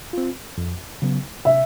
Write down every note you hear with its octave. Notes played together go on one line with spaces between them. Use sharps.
C4 F4
F2
C#3 F#3 B3
C3 E5